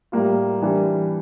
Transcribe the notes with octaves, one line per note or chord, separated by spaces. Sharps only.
A2 G3 A#3 F4
E3 G3 D4